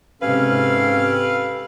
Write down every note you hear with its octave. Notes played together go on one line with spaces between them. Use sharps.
G#2 C3 C#4 G4 A4 B4 F5